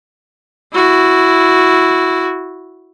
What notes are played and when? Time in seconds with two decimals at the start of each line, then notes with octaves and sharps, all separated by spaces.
0.73 E4 F#4